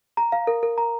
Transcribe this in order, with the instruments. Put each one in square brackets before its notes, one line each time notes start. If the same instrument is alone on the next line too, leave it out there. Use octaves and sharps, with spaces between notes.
[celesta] A#5
F5
A#4
A#4
A#5